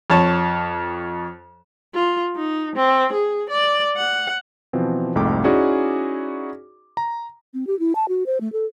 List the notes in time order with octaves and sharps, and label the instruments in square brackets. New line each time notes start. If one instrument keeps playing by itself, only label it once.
[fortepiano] F2 C#5 A5
[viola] F4
D#4
C4
G#4
D5
F#5
[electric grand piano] B2 E3 F3 C4
C2 F2 G#2 A3 G5 D6
C#4 D#4 E4 F#4 G#4 D5
A#5
[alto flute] C4
G4
E4
A5
F#4
C5
A3
A4